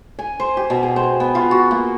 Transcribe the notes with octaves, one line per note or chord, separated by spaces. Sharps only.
G#5
C5
G4
B2
G#4
C5
B3
F4
F#4
A#3